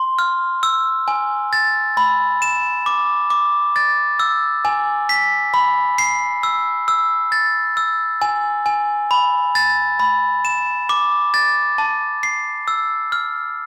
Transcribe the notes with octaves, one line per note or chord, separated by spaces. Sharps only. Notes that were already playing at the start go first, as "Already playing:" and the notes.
Already playing: C6
F6
E6
G#5
A6
B5
E7
D6
D6
A6
E6
G#5
B6
B5
C7
E6
E6
A6
E6
G#5
G#5
B5
A6
B5
E7
D6
A6
A5
C7
E6
F6